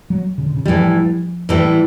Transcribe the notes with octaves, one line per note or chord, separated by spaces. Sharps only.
F#3
C#3
D3
C#3
A2 E3 F3 G3
A2 E3 G3